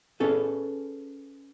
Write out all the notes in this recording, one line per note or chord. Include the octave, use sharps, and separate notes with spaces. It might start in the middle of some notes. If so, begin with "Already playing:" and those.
C#4 G#4 A4 B4